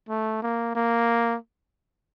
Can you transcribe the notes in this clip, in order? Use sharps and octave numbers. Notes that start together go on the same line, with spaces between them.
A3
A#3
A#3